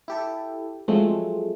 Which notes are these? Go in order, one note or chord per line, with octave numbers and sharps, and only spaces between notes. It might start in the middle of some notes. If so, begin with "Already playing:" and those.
E4 G4 A4
F3 F#3 G#3 A3 C4